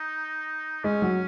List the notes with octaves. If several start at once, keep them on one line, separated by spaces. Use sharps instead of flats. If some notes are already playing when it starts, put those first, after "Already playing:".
Already playing: D#4
G#3 C#4
F#3